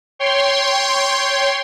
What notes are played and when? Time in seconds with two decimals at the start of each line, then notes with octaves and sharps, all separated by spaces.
0.19 C#5 G5 C6